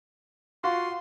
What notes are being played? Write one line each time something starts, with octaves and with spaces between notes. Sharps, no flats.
F4 F#4 C6